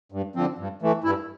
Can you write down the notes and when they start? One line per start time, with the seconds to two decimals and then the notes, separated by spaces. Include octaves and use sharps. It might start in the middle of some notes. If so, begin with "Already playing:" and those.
0.12 G2
0.36 D3 F3 C4
0.58 G2
0.82 E3 A3
1.04 G2 E4